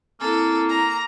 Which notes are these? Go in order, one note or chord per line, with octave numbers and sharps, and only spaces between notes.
A#3 C4 E4 A4
A#5